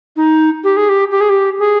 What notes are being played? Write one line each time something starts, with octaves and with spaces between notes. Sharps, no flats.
D#4
G4
G#4
G4
G4
G#4
G4
G#4